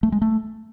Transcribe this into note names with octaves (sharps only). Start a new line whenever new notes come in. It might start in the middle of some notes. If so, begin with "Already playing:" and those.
A3
G#3
A3